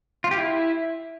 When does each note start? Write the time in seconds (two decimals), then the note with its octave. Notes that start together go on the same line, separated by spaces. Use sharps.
0.24 F4
0.31 G4
0.38 E4